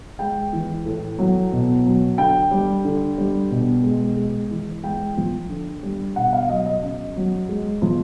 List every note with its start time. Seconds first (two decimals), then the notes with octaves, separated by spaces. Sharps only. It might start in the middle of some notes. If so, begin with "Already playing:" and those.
0.19 G#3 G5
0.53 E3
0.86 A2
1.18 F#3
1.52 B2
1.86 F#3
2.18 D3 G5
2.51 G3
2.85 D3
3.18 G3
3.51 B2
3.84 G#3
4.17 G#3
4.51 E3
4.83 G#3 G5
5.17 F3
5.50 D3
5.83 G3
6.16 B2 F#5
6.33 F5
6.49 F#3 D#5
6.66 D#5
6.82 C#3 D#5
7.16 F#3
7.49 G#3
7.82 F3